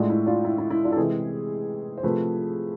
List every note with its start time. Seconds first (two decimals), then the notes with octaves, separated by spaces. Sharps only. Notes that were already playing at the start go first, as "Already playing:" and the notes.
Already playing: A2 G#3 D4 F4
0.10 E4
0.26 D4 F4
0.44 E4
0.58 E4
0.70 E4
0.84 D4 F4
0.92 A4
0.97 C3 E3 G#3 E4 G#4
1.98 C5
2.03 C3 F3 A3 G#4 B4